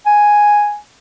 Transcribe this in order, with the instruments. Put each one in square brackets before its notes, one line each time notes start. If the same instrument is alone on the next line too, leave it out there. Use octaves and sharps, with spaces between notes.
[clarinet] G#5